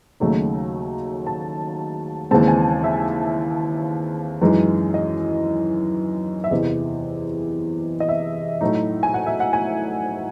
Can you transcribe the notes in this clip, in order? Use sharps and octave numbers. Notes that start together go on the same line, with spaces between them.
D#2 C#3 F#3 A3 D#4
A5
D#2 C#3 E3 G#3 C4 A5
G#5
E5
F#2 E3 G#3 D#4
D#5
E5
E2 C3 E3 D#5
D#5
E5
A2 F#3 A3 D#4
G#5
F#5
E5
F#5
G#5